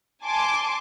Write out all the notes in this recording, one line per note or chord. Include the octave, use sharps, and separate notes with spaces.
G#5 A5 C6 D6